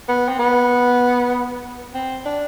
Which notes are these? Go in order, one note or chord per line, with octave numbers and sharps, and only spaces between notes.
B3
C4
B3
C4
D4